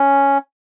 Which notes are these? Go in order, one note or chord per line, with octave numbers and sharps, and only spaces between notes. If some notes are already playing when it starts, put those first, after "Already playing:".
Already playing: C#4